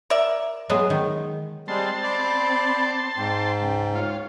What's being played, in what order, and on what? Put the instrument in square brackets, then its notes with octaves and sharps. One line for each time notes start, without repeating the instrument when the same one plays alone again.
[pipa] A#4 D5 E5
[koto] F#3 G#3 B3
D#3
[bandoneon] G3 G#3 [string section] C4 [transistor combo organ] A5 C6
[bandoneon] D5 [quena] B5
[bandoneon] G#2 [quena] G5
[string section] C#2
[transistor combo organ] F4 [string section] C#5